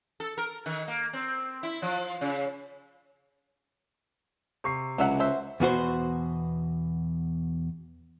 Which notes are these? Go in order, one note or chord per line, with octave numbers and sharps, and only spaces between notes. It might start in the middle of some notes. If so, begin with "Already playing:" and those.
A4
A#4
D#3
A#3
C4
E4
F3
C#3
C3 C#6 C7
C#2 F#3 E5 F#5
F#4 C5 E5
E2 B2 F#4 C5